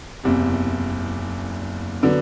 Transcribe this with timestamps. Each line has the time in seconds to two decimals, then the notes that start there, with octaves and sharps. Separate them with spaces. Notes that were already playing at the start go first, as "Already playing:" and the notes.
0.24 F#1 E2 C3
2.03 D3 F#3 B3